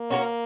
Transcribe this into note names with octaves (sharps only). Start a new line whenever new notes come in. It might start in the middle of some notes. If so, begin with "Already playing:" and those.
Already playing: A#3
C#4 F#4 A#4